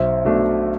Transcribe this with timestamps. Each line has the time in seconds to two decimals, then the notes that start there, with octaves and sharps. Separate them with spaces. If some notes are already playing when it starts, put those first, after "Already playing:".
Already playing: B1 C5 E5
0.25 B2 A3 D4